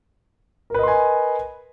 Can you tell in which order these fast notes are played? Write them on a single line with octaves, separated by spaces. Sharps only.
A#4 B4 D#5 C6 G#5